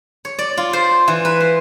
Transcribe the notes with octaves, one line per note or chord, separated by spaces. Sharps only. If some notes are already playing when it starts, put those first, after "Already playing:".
C#5
D5
F4
C5
E3
B4
C5